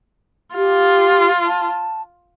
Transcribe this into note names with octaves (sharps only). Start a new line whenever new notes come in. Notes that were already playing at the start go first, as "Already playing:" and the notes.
F4 G4
A5